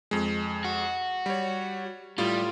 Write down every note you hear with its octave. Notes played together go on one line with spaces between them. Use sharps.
F2 G#3
F#4
G3 C#5
A2 G3 F4